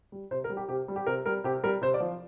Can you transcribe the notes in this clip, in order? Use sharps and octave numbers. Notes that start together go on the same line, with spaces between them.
G3
C3 C5
A#4
G3
G4
C3 G4
G3
G4
C3 A#4
G3 A#4
C3 G4
G3 A#4
C3 C5
D5
F3